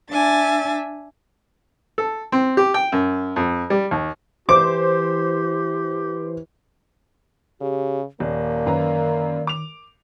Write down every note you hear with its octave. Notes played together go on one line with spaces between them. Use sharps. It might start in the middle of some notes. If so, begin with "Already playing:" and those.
D4 E5 G#5 A6
A4
C4
G4
G5
F#2
F2
G3
D#2
E3 G4 C5 D6
C#3 G4
D#1 A#3 D5
F#2 D#3 B4 A#5
D6 F7